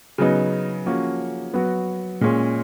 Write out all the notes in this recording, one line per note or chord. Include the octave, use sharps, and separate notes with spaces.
C#3 F#3 B3 D#4
F3 A#3 C#4 F#4
F#3 B3 F#4
A#2 G#3 C#4